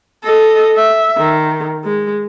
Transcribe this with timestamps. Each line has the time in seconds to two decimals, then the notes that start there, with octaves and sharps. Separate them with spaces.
0.24 A4 D#5
0.75 E5
1.18 D#3
1.85 G#3